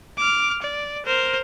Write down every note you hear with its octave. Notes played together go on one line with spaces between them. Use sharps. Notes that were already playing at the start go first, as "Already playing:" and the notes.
D6 F6
D5
A#4 C5